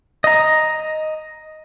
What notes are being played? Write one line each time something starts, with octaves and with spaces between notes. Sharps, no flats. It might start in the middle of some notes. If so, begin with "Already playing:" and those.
D#5 A#5